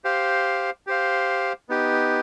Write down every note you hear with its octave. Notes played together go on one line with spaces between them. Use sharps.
G4 C5 F5
G4 C5 F5
B3 D#4 G4